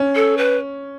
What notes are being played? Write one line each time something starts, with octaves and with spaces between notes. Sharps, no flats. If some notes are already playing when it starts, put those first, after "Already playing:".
Already playing: C#4
A4
B4